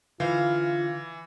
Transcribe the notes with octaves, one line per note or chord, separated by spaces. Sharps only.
D3 E3 F4 C5 F5